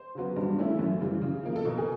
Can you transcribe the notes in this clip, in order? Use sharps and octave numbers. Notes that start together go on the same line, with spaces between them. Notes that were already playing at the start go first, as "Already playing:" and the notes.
Already playing: C5
C#3 F#3 B3
G2
E3 A3 C#4 E4
F#2
C#3 E3 G3
C#3
F3 A#3
A4
B2 A#4
G#4